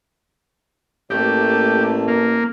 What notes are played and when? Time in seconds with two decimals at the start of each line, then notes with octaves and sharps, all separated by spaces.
1.10 A1 A3 A#3 G4
2.08 A#3